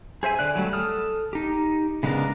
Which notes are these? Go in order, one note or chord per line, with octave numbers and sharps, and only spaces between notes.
G#4 C5 E5 G#5
D3 D5 F#6
F#3 G3 A3
A4 D#6 F6
D#4 G4
C#3 G#3 B3 D4 A#4